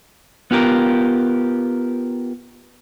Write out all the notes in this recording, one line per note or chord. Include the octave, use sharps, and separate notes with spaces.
B3 F4 G4 A#4